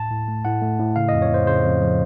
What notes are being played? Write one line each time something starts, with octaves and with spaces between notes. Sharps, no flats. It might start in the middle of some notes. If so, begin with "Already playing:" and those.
Already playing: A2 A5
A2
A3
A2 F#5
A3
A2
C#3 F5
F2 D#5
C#5
F2 C5
C#3 C5
F2
F3